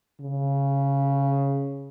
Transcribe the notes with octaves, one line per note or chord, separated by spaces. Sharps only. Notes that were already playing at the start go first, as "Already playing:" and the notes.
C#3